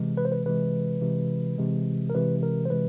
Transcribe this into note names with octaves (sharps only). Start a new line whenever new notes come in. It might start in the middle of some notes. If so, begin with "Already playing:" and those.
Already playing: C3 E3 G#3
B4
C5
B4
C3 E3 G#3 B4
C3 E3 G#3
C3 E3 G#3
A#4
C3 E3 G#3 B4
A#4
C5
C3 E3 G#3 B4